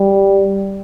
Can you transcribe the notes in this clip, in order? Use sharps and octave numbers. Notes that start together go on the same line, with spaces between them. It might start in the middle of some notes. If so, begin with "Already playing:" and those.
Already playing: G3